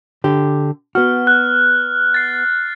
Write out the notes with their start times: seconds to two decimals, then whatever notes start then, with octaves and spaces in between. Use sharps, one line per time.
0.24 D3 G4
0.95 B3 F#4 F6
1.27 F#6
2.14 A6 C7